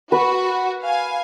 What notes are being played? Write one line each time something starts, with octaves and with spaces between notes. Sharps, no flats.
F#4 B4
F5 G#5